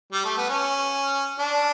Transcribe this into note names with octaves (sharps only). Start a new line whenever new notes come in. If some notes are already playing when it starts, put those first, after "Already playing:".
G3
A3
B3
C#4
D4